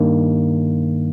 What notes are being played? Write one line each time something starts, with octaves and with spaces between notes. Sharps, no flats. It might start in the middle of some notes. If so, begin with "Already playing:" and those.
Already playing: G2 D#3 A#3